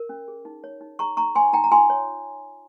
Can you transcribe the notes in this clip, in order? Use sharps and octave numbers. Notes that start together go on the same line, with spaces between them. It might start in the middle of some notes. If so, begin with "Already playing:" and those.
Already playing: A#4
C#4
G#4
D#4
C#5
D#4
G#4 A#5 C#6
D#4 A#5 C#6
C#5 G#5 C6
D#4 G5 A#5
A#5
F4 G#5 C6
C#5